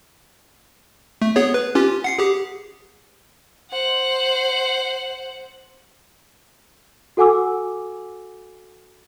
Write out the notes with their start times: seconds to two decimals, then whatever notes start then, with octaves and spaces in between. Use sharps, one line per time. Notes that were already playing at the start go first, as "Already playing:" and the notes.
1.22 A3
1.36 B3 G#4 C#5
1.54 B4
1.75 C#4 F4 G4
2.04 F#5 C7 C#7
2.18 G4 G#4
3.70 C5 F#5
7.17 F#4 A4 F#5 G#5 D6 E6